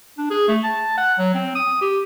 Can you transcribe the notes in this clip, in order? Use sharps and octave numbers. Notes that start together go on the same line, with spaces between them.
D4
G#4
A3
A5
F#5
F#3
C4
D#6
G4